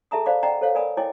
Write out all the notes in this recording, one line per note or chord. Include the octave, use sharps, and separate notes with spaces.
G#4 A4 E5 A5 A#5 D#6
C5 D5 F5 B5 D6
C#4 D5 D#5 F#5 G5 A#5
A4 C5 C#5 F5
A#4 D5 G#5 B5 D#6
E4 C#5 D#5 G5 G#5 D6